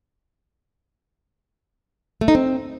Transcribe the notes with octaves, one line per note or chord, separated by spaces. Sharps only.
A3
D#4
C4